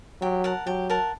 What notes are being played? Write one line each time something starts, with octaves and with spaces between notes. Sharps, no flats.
F#3 G4
A#4 F#5 A5
F#3 G4
A#4 F#5 A5